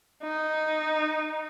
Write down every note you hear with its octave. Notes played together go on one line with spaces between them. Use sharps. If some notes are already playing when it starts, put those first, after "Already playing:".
D#4